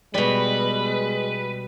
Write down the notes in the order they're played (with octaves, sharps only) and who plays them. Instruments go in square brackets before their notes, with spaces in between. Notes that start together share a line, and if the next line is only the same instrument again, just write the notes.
[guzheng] B2 G3 [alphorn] G#3 [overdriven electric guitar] B4